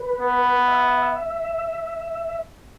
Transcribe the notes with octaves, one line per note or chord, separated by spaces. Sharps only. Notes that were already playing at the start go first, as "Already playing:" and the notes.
Already playing: B4
B3
E5